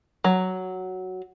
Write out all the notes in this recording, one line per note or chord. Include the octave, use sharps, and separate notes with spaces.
F#3